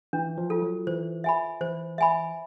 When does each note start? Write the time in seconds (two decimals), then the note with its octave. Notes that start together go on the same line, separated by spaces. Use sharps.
0.13 E3 D4
0.38 F3
0.50 F4 A4
0.62 F#3
0.87 E3 C5
1.24 E5 G#5 B5
1.61 E3 C5
1.98 E5 G#5 B5